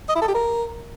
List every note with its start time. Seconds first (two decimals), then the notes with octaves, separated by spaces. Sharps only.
0.09 D#5
0.15 E4
0.22 A4
0.28 G4
0.35 A#4